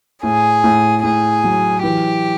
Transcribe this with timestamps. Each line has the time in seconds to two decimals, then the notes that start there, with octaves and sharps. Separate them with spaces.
0.23 A2 G#4
0.64 A2
1.04 A2 G#4
1.44 F#3
1.83 E3 G4